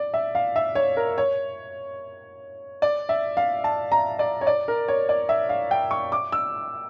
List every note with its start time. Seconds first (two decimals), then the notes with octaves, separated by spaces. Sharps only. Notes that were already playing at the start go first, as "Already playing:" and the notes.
Already playing: D5
0.14 E5
0.35 F5
0.56 E5
0.75 C#5
0.97 A#4
1.18 C#5
2.82 D5
3.09 E5
3.37 F5
3.64 A5
3.92 A#5
4.19 D5
4.41 C#5
4.47 D5
4.68 A#4
4.88 C#5
5.09 D5
5.29 E5
5.49 F5
5.71 G5
5.91 C#6
6.12 D6
6.32 E6